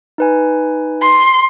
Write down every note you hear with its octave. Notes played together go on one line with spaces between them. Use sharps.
D#4 B4 G#5
C6